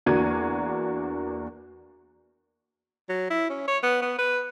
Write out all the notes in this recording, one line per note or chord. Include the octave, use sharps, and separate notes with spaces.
E2 A#3 D4 F#4 G#6 D#7
F#3
E4
C#4
C#5
B3
B3
B4